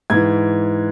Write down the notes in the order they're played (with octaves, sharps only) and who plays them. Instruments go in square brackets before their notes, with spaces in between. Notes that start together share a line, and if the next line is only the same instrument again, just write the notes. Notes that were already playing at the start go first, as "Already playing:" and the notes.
[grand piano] G#2 E3 G#6